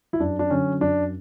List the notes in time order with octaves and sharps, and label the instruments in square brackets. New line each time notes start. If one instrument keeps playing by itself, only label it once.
[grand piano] E4
F#2 D4
D4
D3 F#3 C#4
F#2 D4